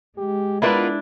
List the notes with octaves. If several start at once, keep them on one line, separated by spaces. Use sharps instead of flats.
G#3 G4
B3 D4 E4 F4 A#4 B4